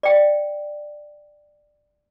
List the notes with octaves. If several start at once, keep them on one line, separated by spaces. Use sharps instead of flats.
D5 G5